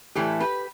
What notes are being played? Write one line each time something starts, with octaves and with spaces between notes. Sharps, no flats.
A2 E3 A3 E4 G4
G4 B4